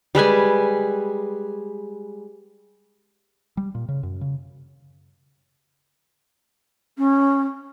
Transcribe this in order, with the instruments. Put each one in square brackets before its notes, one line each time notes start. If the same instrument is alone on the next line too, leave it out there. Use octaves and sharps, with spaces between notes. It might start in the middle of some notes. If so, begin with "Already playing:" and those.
[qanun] G3 G#3 B4 G#5
[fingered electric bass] G3
A#2
C#3
F#2
C#3
[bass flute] C#4